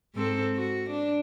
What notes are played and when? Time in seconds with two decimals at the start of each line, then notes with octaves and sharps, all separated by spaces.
0.14 G#2 C4 A4
0.57 F#4
0.90 D4